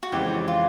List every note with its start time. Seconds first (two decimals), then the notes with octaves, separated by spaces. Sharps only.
0.03 F#4
0.12 F2 C#3 E3 G#3 C4 G4
0.48 F4